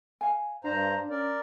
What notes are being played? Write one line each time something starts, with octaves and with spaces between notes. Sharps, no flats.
F5 G#5
G2 D4 C5 F5 A#5
C#4 A#4 D5